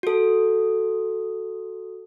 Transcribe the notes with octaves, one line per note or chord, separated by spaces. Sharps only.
F#4 A4